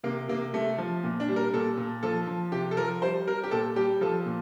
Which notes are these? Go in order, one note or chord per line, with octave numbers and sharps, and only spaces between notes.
C3 A#3
C3 A#3
C3 A3
F3
A#2
D4
G3
A#4
A#2 A4
A#2
F3 A4
F3
C3 G4
A4
F3 A#4
G3 C5
G3 A#4
G4
A#2 A4
G3 G4
F3 A4
A#2